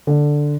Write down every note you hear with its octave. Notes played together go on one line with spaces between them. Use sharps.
D3